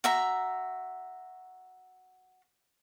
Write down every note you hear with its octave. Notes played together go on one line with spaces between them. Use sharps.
F#4 E5 A#5